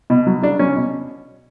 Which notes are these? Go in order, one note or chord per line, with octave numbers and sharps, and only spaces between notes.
B2
F#3
C#3 D4
F#3 C#4
B2